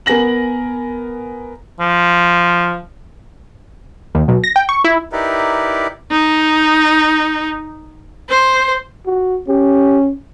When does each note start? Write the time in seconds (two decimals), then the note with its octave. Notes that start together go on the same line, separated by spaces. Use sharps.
0.06 B3 A#4 G#5 A#6 F#7
1.80 F3
4.15 D#2
4.28 B1
4.44 A#6
4.56 G5
4.69 C#6
4.84 E4
5.12 D#4 E4 G4 A#4 B4 D5
6.11 D#4
8.29 C5
9.06 F#4
9.48 C#4 G4